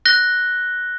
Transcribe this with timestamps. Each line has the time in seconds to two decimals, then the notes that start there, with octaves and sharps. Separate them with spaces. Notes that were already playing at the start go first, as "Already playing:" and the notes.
0.05 F#6 A#6 G7